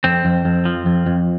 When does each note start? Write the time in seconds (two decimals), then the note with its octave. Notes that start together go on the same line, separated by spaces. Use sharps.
0.04 F2 C4
0.25 F2
0.45 F2
0.65 F3
0.86 F2
1.06 F2